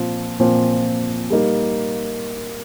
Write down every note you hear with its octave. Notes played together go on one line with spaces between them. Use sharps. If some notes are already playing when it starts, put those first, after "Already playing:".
Already playing: A#2 F3 C4 F4
A#2 F3 C4 F4
G3 A#3 D#4